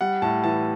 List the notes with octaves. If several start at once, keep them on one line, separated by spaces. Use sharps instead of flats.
G3 F#5
A2 A5
E3 A5